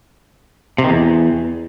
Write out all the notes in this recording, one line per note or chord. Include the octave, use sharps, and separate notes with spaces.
C3
D#3
E2